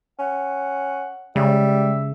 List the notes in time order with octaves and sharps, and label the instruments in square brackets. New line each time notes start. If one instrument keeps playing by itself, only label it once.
[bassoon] C#4 [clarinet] F#5
[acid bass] C#3 [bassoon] G3 [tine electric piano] G#3 [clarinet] E5